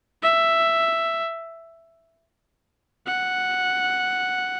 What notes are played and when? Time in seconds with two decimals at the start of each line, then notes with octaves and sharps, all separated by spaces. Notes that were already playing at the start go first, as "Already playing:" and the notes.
0.23 E5
3.07 F#5